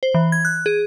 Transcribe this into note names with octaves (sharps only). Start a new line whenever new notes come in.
C5
E3
G#6
F#6
G#4